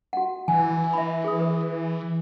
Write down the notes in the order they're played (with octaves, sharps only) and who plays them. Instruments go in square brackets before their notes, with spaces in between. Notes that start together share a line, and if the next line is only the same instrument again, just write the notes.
[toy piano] F#4 F#5
[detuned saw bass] E3 [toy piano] G#5
[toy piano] E5 B5
G#4 D#6
B4